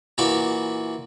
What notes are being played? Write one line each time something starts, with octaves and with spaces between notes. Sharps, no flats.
A#2 E3 F#4 E5 B5 D6